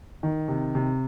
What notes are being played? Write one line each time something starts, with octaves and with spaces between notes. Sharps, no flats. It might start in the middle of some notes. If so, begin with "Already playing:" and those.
D#3
C3
C3